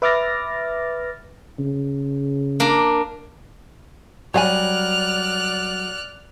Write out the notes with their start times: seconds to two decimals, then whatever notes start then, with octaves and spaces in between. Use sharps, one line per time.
0.02 B4 E5 D6 F6 A6 A#6
1.59 C#3
2.60 A#3 D4
4.34 F#3 G3 C#5 D5 F5 G#5 F6 F#6